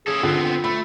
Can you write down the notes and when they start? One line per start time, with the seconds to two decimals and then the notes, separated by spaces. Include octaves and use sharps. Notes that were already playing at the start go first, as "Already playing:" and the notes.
0.07 C#4 G#4 A4
0.23 D3 B3 C4 F4
0.64 A3 B5